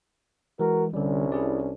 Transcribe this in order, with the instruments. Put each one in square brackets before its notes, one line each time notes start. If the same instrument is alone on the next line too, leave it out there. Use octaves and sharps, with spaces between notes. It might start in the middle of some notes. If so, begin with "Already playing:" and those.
[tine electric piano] E3 G#3 [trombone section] F#4 A#4
[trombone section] C2 C#4 D4 [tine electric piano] D3 G3
[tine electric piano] E4 G#4 D5